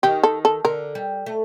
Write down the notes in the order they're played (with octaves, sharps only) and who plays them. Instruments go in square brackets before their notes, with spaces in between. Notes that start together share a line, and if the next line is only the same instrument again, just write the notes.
[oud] D#3 [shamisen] G4
[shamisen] A4
A4
[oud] D3 [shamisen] A#4
[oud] G3
A3